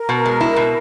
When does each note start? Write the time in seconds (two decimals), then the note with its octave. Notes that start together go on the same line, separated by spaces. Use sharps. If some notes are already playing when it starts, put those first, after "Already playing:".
Already playing: A#4
0.09 B2
0.25 G#3
0.41 E4
0.56 B2